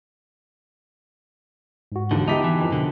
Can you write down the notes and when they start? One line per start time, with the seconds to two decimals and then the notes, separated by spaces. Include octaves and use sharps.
1.92 G#2 F#4
2.11 D#2 D3 E3
2.28 B3 D#4 E4 G4 A5 D6 B6
2.44 E3
2.60 F2 D#3
2.72 B2 D3